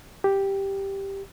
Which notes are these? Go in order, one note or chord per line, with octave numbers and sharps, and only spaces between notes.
G4